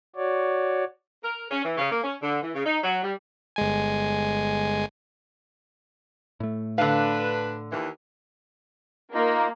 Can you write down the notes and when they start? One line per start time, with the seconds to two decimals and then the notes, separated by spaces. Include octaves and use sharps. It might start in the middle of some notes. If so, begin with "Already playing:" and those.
0.16 F#4 C#5 D5
1.24 A#4
1.51 C#4
1.64 E3
1.78 C#3
1.92 A#3
2.04 C#4
2.22 D3
2.42 E3
2.54 C#3
2.65 D#4
2.84 F#3
3.04 G3
3.56 G1 G#3 G#5
6.40 A2 A3
6.78 D3 D4 B4 F5
7.71 D#2 E3
9.14 A#3 D#4 F4